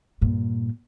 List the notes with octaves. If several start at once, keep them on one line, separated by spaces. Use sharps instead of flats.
G2 A#2